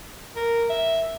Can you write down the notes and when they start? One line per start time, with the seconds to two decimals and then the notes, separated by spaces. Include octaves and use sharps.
0.36 A#4
0.69 E5